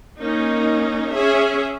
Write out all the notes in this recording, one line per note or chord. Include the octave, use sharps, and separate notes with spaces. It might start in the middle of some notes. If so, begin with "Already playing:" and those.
A#3 C#4 D#4
C#4 G#4 E5